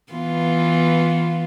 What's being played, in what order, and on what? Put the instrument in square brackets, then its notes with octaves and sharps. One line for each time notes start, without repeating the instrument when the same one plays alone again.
[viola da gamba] E3 B3 F4